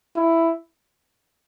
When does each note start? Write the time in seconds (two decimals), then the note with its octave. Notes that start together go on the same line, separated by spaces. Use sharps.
0.16 E4